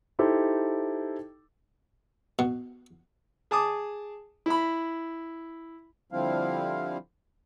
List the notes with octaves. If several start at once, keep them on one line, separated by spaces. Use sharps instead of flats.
D#4 E4 G4 A4 C5
B2
G#4 A5 D6 D#6
E4 B5
D3 F3 G3 C4 E4 F5